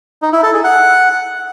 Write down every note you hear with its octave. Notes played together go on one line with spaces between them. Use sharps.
D#4
E4
A4
G#4
F#5